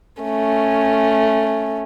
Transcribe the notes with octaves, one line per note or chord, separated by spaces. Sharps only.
A3 C#4